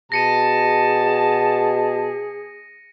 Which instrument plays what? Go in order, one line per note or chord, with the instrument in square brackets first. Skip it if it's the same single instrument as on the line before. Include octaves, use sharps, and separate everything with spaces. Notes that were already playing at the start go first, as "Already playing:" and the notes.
[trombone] B2 [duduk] G#4 [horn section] A5 [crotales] A#6 C#7 D#7